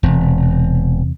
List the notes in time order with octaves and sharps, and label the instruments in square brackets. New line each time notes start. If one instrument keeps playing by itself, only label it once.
[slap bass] E1 [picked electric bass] E2 C3